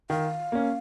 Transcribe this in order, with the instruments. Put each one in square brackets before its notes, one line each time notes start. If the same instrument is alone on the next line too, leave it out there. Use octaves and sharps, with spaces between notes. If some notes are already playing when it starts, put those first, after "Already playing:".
[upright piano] D#3 [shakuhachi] F5
[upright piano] A#3 C#4